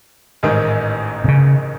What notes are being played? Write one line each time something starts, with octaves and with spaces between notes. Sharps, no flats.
A1 G#2 D#3
C3
C#3